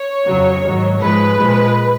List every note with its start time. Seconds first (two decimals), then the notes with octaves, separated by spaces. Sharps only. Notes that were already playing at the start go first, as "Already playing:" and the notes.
Already playing: C#5
0.27 F2 C#3 F#3
0.64 G#2 D#3 F#3
1.01 G#2 F3 G#3 B4
1.37 A#2 F3 G#3